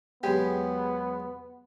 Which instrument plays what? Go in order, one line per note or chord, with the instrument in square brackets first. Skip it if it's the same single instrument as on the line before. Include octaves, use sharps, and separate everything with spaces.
[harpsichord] E2 F#3 G#3 [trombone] B3 [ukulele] G4